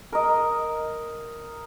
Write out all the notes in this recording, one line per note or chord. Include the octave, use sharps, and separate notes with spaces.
A#4 D#5